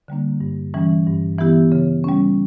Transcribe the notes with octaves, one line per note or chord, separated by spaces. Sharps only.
D3 G3 A#3 D4
G2
E3 G3 C#4
G2
E3 B3 E4 G4
C#3
G3 C#4